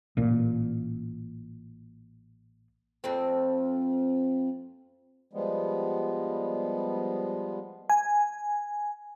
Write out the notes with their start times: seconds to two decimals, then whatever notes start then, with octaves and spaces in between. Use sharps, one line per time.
0.17 A1 A#2
3.04 F2 A3 C4
5.33 F3 G3 G#3 B3
7.90 G#5